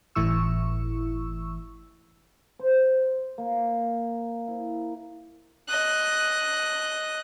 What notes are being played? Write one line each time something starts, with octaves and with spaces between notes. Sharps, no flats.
G1 A2 E3 E4 C#6 E6
C5
A#3
E4
D#5 F#6